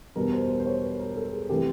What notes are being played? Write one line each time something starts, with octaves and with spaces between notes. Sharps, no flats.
E2 B2 G3 A#4
C5
C5
C5
C#5
B4
A#4
A4
G#4
C3 E3 A3 G4